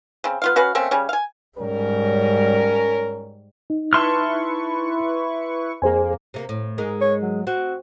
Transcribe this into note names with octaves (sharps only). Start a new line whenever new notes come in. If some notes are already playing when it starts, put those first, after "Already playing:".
C#3 C4
B3 F4 F5
C#4 F#4 B4 F5
A3 A#3 C4 C#4
C#3 G3 C#4
F5 G#5
G#2 G3 C#4 A#4
D#4
E4 B4 A5 C6 C#6 F6
F2 A#3 G#4 C5 G#5
C3 A3 A#3
A2
G#2 G#3 A#4
C#5
F#3
C4 F#4